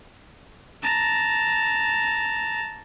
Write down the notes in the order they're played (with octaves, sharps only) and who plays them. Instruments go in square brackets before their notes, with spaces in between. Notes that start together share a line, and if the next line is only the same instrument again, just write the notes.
[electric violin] A5 A#5